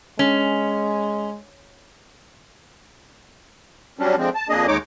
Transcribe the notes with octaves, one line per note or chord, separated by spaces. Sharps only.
G#3 C#4
F#3 G3 C#4 D4
D3 F3 G#3 C4
A5
F2 A#3 D4 G#4 D#5
D#2 G#3 D#4 C#5 D6